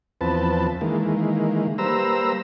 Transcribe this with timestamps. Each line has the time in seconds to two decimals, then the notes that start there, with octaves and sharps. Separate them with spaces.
0.21 E2 F3 C4 B4 A5
0.81 D#3 E3 G#3 A#3
1.78 G3 A#3 B4 C5 A#5 E6